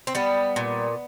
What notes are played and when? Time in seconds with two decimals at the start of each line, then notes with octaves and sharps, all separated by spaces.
0.07 C4
0.15 G3 B3
0.56 A#2